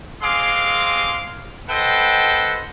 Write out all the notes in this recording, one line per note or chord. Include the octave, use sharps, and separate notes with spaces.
G#3 C4 G#4 F5 C6 D6
A4 B4 C5 D#5 F#5 G5